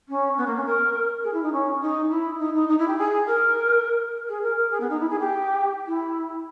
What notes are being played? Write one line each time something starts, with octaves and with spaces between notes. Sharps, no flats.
C#4
B3
A#3
C#4
A#4
G#4
E4
D#4
C#4
D#4
E4
D#4
D#4
D#4
E4
G4
G#4
A#4
G#4
A#4
A#4
G#4
B3
D#4
E4
G#4
G4
E4